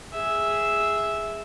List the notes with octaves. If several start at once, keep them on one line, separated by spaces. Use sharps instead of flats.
G#4 E5